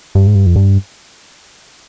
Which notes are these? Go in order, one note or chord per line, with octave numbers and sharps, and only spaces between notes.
G2
G#2
G2
F2
G2